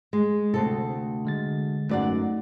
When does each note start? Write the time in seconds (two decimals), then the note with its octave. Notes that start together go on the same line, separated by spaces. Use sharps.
0.13 G#3
0.54 D2 C3 A3 C4 A4
1.25 D3 G#3 A6
1.89 F#2 A3 D#4 D5 F#5